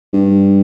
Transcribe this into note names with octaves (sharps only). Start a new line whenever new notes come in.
G2